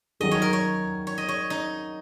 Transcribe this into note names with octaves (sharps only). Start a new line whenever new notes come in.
D#3 F#3 D#4 G#4 D#5
C#5
A#4
C#5
C#5
D#5
C#5
D#4